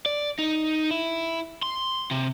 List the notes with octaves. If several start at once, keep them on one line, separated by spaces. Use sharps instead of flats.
D5
D#4
E4
C6
C3